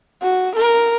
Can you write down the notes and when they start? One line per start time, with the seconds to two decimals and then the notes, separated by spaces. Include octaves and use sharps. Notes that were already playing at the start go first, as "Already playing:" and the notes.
0.23 F#4
0.56 A#4